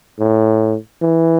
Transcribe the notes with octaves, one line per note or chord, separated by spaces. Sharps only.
A2
E3